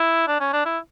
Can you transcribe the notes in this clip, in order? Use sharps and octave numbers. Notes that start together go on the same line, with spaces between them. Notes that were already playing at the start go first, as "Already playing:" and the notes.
Already playing: E4
D4
C#4
D4
E4